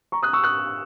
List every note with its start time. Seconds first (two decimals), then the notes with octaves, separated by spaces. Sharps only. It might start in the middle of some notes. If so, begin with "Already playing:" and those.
0.12 A#5 C#6
0.23 D#6 F#6
0.33 C#6 E6
0.43 D#6 F#6